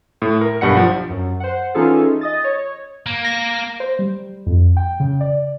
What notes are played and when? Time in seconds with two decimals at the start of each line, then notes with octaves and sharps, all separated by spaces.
0.22 A2
0.41 A#4
0.61 B1 G2 G3 F#5 C#7
0.77 F3
1.10 F#2
1.40 C5 F#5
1.74 E3 C#4 D#4 F4 G#4 A4
2.21 D#5 D#6 A6
2.44 C#5
3.06 A#3
3.25 A#6
3.80 C5
3.99 G3
4.46 F2
4.77 G5
5.00 C#3
5.21 D5